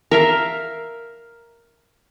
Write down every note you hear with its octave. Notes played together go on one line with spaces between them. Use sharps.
A#4 E5 F5